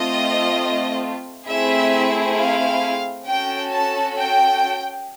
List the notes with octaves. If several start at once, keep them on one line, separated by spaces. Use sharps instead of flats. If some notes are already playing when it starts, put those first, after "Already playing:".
Already playing: A3 C4 F4 D#5
A3 C4 E4 G#4 E5
F5
C#4 F#4 A4 G5
A5
G5